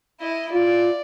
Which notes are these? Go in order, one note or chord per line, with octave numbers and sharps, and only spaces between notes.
E4 D#5
F4 D5